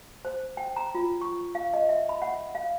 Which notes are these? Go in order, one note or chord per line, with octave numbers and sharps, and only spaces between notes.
C5
G5
A#5
F4
C#6
F5
D#5
E5
B5
F#5
F5